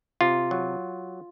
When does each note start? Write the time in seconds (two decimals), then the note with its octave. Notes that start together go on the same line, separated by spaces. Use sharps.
0.21 C3 F4
0.51 F#3